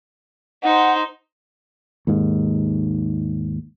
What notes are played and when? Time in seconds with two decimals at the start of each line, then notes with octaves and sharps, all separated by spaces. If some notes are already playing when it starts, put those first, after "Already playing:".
0.63 D#4 C5 F#5
2.07 D#2 G#2